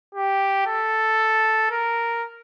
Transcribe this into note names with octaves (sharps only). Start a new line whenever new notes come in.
G4
A4
A#4